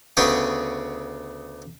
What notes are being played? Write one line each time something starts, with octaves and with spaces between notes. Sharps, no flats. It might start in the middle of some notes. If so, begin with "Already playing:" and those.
D2 C#3 B3 C#4 G#4 G5